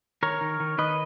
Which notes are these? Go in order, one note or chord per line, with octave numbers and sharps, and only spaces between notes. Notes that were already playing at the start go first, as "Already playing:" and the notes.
D#3 A#4 C#5
D#3
D#3
D#3 B4 D#5